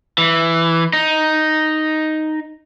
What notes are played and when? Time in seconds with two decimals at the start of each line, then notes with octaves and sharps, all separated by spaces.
0.18 E3
0.93 D#4